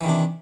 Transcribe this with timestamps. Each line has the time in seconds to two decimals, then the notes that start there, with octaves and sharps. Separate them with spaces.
0.01 E3
0.03 D#3
0.06 C3
0.09 D4